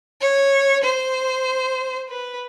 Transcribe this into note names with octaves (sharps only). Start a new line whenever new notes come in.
C#5
C5
B4